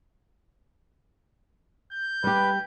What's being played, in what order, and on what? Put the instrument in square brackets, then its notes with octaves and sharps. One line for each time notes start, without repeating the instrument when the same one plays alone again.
[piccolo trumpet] G6
[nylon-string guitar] G3 G4 [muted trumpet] B4